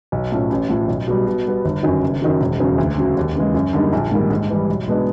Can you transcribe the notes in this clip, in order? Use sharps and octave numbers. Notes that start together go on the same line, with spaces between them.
B1
A2 F3 A3 C#4
A1
A2 F3
B1
B2 G3
B2
G3 B3
G1
F#2 D#3 F#3
F#1
F#2 D#3 F#3
E1
E2 C#3 F#3
D2
C#3 F#3
D#2
C#3 E3 G#3
F#2
D3 G3 A#3 D#4
A#1
G#2 D#3 G3 A#3
G#2
E3 G3
B1
B2 G#3 B3 D4